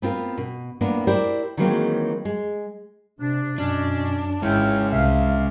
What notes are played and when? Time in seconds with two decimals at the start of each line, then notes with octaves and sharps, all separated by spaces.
0.02 B3 C4 F4 A#4
0.38 B2
0.81 A2 A#3 B3 D4 F4
1.07 E4 G4 A#4 C5 D5
1.57 D#3 E3 F#3 G#3 A#3 C4
2.25 G#3
3.20 C3 D4
3.58 F#2 B2 C#4 D4
4.42 G#1 G#3 C#4 E4 C#5 G5 F6
4.90 C2 E5 F5